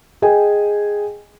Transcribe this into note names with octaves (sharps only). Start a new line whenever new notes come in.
G#4 D#5 G5 G#5